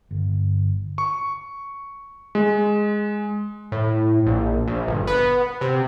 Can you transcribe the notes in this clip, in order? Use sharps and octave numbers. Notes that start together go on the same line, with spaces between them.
G1
C#6
G#3
A2
A#1
A#1
G1
B3
C3